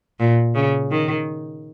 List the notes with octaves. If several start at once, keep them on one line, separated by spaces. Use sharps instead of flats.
A#2
C#3
D#3